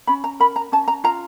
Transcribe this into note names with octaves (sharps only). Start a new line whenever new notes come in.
C#4 B5
A#5
A#4 B5
A#5
C#4 A5
A#5
F4 A#5